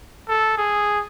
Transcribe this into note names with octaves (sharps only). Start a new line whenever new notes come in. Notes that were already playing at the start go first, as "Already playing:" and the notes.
A4
G#4